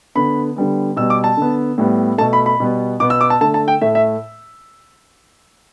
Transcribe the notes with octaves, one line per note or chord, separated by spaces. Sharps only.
D3 B3 B5
D3 G3 B3
B2 G3 B3 E6
D6
A5
D3 B3
A2 G3 B3
B2 A3 A5
B5
B5
B2 G3 B3
B2 B3 D6
E6
D6
A5
D3 A3 A5
A5
G5
A2 A3 E5
E5